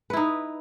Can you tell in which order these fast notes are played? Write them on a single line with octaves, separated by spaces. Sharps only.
B4 E4 D#4